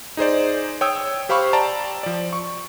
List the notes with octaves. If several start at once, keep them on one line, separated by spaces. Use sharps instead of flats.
D#4 G#4 C5 D5
C#5 G5 D#6 E6
G4 C5 F5 B5 C#6
D5 G5 A5 A#5
F3 D5
C#6